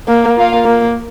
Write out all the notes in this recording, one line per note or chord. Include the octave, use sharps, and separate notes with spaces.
A#3
A#3 F4 A#4 F5
A#3